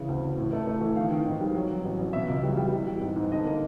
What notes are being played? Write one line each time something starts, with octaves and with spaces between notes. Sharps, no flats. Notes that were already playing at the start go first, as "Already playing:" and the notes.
Already playing: C#3 E3
D2
D2
A2
A3
A3
E3
D#3 F5
D#3
G#2
G3
F#3
F#3
A1
A1
B2 E5
C#2
G3
G3
E3
G3
G#2
G#2
D3 D#5
A#3